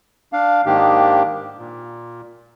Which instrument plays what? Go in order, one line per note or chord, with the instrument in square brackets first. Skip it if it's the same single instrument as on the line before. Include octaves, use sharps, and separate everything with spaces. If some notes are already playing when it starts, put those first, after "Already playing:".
[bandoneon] D4 F5
G#2 D#3 A#3 D4 G4
A#2